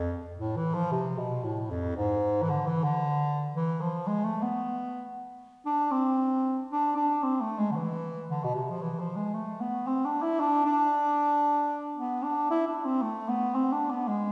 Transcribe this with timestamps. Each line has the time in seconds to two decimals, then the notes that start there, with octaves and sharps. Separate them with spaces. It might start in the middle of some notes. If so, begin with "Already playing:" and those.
Already playing: F2
0.38 A2
0.56 E3
0.74 F3
0.91 C3
1.18 B2
1.44 A2
1.70 F2
1.96 G#2
2.43 E3
2.50 D3
2.67 E3
2.84 D3
3.55 E3
3.81 F3
4.07 G#3
4.24 A3
4.42 B3
5.66 D4
5.91 C4
6.71 D4
6.96 D4
7.23 C4
7.41 A3
7.58 G#3
7.71 D3
7.76 E3
8.29 D3
8.44 B2
8.55 C3
8.71 F3
8.82 E3
8.99 F3
9.16 G#3
9.34 A3
9.60 B3
9.87 C4
10.05 D4
10.22 E4
10.40 D4
10.65 D4
11.97 B3
12.23 D4
12.50 E4
12.68 D4
12.85 C4
13.02 A3
13.28 B3
13.55 C4
13.72 D4
13.90 B3
14.08 G#3